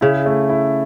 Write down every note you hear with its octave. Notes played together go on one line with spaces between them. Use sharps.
C#3 E4
A3
E4